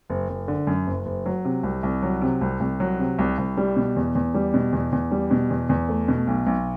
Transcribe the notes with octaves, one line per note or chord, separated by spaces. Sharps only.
F#1
F#1
D3
F#2
F#1
F#1
F#3
C3
C2
C2
F#3
C3
C2
C2
F#3
C3
C2
C2
G3
B2
E2
E2
G3
B2
E2
E2
G3
B2
E2
E2
A3
B2
B1
B1